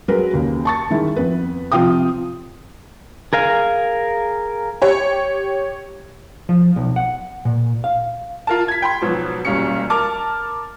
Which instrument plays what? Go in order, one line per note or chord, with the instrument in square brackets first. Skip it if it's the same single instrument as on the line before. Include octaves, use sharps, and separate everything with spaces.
[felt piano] F#3 G#3 A#4 B4
D#2 C#3
A5 C#6 A6
D#3 G#3 E4
F2 B3 B4
C3 F3 F4 F5 G5 D#6
[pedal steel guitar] G#4 A#4 F5 G#5
[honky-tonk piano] G4 C#5
[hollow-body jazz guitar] F3
B1
F#5
A#2
F5
[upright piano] F4 A#4 A5
G#6 B6
G5 B5 C6
G#2 B2 F3 F#3 B3
E1 B1 G2 A#2 C#4 C#7
A#4 A5 D6 F6